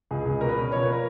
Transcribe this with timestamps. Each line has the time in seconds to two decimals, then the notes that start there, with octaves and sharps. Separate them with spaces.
0.11 C#2 G#4
0.25 C#2
0.41 B2 A#4
0.49 B4
0.56 C#4 A#4
0.72 F3 C#5
0.83 B4
0.87 A#3
0.92 A#4